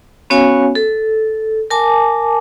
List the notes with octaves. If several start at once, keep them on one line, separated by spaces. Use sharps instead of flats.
B3 C#4 F#4 C#5 F5 G#5
A4
A#4 G#5 A5 D6